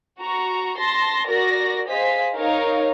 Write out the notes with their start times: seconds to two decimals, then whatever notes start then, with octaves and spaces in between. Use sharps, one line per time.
0.20 F#4 A#5 C#6
0.79 A5 C6 A#6
1.27 F#4 A#4 D5 A#6
1.89 G#4 C5 D#5 F5 B6
2.36 D#4 A#4 C#5 F5